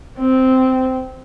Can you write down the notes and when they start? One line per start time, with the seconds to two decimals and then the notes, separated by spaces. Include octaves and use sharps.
0.18 C4